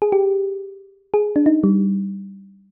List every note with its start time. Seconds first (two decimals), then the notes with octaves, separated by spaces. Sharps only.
0.02 G#4
0.12 G4
1.14 G#4
1.36 D4
1.46 D#4
1.64 G3